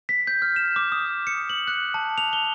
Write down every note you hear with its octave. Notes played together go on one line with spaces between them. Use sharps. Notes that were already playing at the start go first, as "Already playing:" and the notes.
B6
G6
F6
E7
D6
D#6
C#7
F#7
F#6
A5
F7
G7